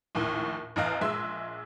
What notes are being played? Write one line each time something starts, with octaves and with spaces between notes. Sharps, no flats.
A#1 D#2 A2
A1 E2 D#5 F5 F#6
A#1 G#3 E5 C6 E6